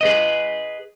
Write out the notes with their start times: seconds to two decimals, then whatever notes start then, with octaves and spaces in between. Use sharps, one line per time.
0.01 G#4 B4 D#5